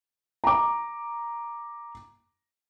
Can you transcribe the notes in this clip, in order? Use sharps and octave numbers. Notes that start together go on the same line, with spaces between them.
A#5 D6